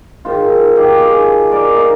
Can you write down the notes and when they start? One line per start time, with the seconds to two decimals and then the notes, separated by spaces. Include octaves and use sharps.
0.25 G#2 D#3 G#3 F4
0.50 D#4
0.76 D#4 G4
1.01 F4 G#4
1.52 A#4 D5
1.76 D#4